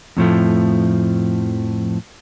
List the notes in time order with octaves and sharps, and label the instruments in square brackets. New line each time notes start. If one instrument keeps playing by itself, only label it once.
[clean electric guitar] F2 A2 F3 A3